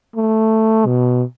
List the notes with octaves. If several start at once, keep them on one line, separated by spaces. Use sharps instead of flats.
A3
B2